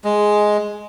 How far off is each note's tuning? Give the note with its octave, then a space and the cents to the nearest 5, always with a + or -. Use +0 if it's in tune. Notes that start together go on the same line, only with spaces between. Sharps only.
G#3 +5